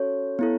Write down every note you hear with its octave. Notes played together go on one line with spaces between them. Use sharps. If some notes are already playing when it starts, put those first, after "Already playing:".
Already playing: C#4 F#4 A4 C#5
B3 E4 A4